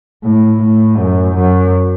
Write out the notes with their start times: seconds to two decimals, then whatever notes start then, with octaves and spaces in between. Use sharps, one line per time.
0.23 A2
0.61 A2
0.98 F#2
1.35 F#2